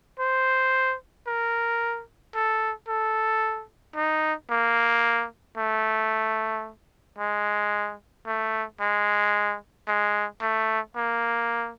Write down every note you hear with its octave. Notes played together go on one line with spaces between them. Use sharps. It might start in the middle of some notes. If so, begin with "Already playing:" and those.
C5
A#4
A4
A4
D#4
A#3
A3
G#3
A3
G#3
G#3
A3
A#3